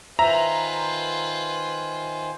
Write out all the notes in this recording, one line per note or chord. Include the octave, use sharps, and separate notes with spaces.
D#3 F4 B4 C5 E5 G#5 A#5